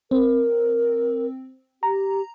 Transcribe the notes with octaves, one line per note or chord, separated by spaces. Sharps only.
C4 A#4
G4 A#5